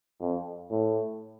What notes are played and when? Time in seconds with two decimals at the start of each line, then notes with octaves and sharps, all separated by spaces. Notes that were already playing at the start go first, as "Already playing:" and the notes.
0.20 F2
0.70 A2